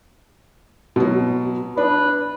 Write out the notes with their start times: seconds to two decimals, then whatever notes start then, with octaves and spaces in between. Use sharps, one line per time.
0.96 B2 F#3
1.77 D4 B4